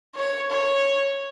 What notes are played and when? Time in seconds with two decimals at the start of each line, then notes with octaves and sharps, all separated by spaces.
0.15 C#5
0.50 C#5